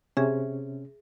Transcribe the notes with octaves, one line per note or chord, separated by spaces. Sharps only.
C3 C#4 G#4 E5